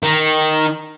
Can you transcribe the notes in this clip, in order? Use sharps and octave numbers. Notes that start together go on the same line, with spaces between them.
D#3